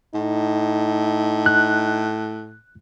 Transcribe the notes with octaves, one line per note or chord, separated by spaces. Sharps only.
A2 D#4
F#6